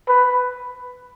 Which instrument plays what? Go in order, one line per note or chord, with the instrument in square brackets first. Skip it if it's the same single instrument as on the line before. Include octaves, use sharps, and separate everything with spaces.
[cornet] B4